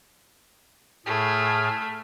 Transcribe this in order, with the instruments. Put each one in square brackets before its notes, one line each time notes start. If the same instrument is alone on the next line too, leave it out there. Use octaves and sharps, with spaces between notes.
[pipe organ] A2 G#4 F6 [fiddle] A3